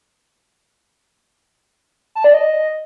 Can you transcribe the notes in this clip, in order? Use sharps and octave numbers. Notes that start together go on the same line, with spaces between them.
A5
D5
D#5